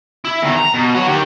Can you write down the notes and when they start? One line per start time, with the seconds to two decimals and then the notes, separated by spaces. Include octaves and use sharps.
0.25 E4
0.42 E2 D#3
0.57 A#5
0.74 B2
0.95 F#4 C#5
1.07 D#3 G4